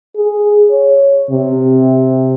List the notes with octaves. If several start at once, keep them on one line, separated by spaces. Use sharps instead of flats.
G#4
C#5
C3